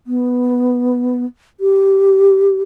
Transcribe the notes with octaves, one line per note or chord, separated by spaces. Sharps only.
B3
G4